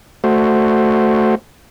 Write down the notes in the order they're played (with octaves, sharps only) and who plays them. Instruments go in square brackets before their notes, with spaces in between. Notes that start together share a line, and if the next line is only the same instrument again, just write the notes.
[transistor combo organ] A3 F#4 C5